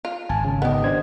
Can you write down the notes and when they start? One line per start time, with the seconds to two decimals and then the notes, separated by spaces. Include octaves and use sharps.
0.05 F4
0.29 G#1 G#5 A5
0.45 C#3
0.62 D#3 B3 G4 D#5
0.84 D4 C5 G#6